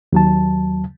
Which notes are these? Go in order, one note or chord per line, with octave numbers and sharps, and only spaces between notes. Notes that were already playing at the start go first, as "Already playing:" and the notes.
D#2 F#3 A5